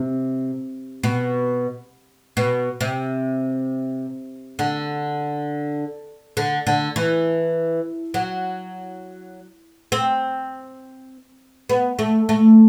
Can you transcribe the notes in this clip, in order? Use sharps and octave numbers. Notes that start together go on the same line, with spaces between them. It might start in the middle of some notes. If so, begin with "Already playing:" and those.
Already playing: C3
B2
B2
C3
D3
D3
D3
E3
F#3
C4
B3
A3
A3